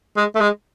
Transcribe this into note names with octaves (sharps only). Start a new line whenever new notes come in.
G#3
A3
G#3